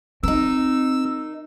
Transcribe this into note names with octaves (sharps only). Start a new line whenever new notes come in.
C4 D#4 A#4 E6